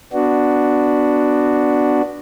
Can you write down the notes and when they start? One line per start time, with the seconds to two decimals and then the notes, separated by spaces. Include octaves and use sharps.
0.13 B3 D4 F#4